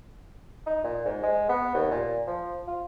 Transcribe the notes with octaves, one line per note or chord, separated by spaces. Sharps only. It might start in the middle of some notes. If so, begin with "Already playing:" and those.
D#4
A#2
G#2
G#3
B3
D#2
A#2
F3
F4